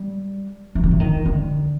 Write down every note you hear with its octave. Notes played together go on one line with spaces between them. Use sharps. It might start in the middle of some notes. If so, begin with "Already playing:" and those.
Already playing: G3
E3
D#3
E3
D#3
D3